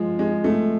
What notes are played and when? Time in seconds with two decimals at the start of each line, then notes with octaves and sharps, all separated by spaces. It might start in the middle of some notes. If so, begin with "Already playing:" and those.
Already playing: F3 G#3
0.19 G#3
0.44 A3